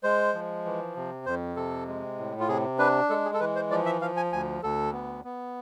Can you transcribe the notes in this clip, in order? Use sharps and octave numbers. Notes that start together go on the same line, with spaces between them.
G#3 C5
F3
E3
C3
F2 C5
C3 A4
G#3
A2
F4
C3 G#4
D4 B4
G#3 A4
G#4
A4
E3 B4
C5
F3 D5
E5
F3 F5
G#5
D2 G#5
D2 A4
B3
B3